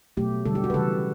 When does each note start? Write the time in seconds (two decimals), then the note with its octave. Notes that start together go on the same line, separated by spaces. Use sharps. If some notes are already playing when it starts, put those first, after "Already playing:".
0.17 B2 F#3 A3 G4
0.45 D3 G3 A4
0.55 G4
0.64 F#4
0.70 B4
0.74 C#3 E3 G3 A4